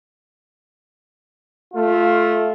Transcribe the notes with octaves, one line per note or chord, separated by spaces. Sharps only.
A3 F4